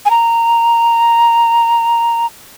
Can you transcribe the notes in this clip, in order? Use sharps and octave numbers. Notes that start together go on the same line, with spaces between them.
G#5
A#5